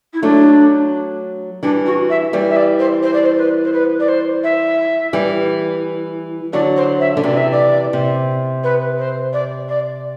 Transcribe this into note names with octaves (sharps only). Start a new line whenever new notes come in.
E4
F#3 A3 D4
E3 G3 D4
F#4
E5
E3 G3 D5
E5
D5
C5
C5
D5
C5
B4
C5
B4
D5
C5
E5
E3 G3
D3 F#3 D5
C5
E5
D3
C3 E3 D5
E5
D5
C3
B4
C5
D5
D5